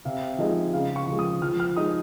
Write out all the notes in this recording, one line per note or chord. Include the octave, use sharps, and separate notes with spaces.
C3 F5
F3 G#3 D#4 D#5
C#3 F5
C#6
F3 G#3
D#6
F3 F6
F6
G#3 D#4 D#6